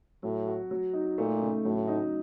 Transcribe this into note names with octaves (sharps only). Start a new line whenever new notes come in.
A2 F#3
F#4
F#3
D#4
A#2 A3
C#3
A2 F#3
D#4